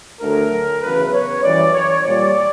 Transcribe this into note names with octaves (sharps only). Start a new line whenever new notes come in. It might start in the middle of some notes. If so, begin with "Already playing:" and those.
D2 D3 F#3 A#4
E2 C#3 F#3 B4
C#5
F#2 E3 G3 D5
C#5
A#2 G3 D5